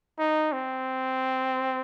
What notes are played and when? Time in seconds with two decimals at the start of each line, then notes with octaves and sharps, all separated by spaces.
0.19 D#4
0.53 C4